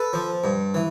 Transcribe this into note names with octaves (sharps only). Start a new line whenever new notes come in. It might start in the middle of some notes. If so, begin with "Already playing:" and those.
Already playing: A4 B4
F3
G2
E3